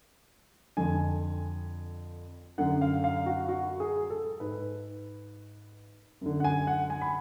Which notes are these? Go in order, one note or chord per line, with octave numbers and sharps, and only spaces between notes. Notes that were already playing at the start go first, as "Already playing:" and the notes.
F2 D3 G#5
F#2 D3 F#5
F5
F5
F#4
F#4
G#4
A4
G#2 B4
F#2 D3
F#5
G#5
F#5
G#5
B5